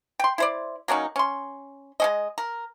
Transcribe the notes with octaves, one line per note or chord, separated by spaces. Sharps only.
G5 C6
E4 C5 D5
F#3 A#3 C#4 D#4
C#4 C6
G#3 C#4 D#5
A#4